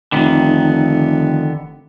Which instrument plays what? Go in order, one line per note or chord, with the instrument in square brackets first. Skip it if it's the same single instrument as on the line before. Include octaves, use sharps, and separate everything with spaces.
[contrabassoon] F1 [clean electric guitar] D3 D#3 B3